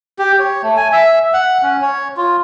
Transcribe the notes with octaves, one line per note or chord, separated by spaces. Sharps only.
G4
C#5
A3
G#5
E5
F#5
C#4
C#5
F4